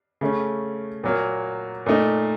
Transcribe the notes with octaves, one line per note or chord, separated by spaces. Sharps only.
C#3 A3 C#4
A#2 F#3 A#3
A#2 A3 D#4